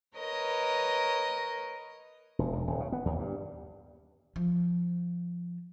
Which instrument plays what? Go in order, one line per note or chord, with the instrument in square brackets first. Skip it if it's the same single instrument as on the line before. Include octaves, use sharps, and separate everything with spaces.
[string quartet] A#4 B4 C#5 D#5
[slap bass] E1
E1
D#1
C#3
B3
D#2
G2
[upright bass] F3